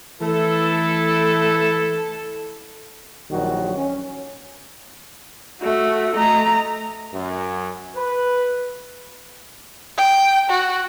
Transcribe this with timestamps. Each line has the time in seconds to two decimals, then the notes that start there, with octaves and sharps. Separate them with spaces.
0.21 E3 A3 E4 A4
3.31 A#1 D#3 F#3 G3 F#4
3.76 C#4
5.62 A3 F#4
6.16 A3 D#5 A#5
7.13 F#2
7.95 B4
9.98 G5
10.50 F#4